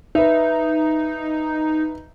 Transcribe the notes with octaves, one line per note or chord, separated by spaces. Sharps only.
D#4 B4 E5